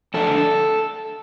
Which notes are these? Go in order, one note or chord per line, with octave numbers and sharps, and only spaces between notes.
F2 D3 A3 D4 A4